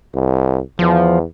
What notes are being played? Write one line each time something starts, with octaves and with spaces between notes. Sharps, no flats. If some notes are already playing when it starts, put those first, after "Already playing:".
C2
E2 F3